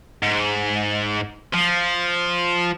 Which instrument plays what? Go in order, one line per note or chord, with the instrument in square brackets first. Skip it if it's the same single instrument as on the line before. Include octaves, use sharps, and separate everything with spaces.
[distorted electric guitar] G#2
F3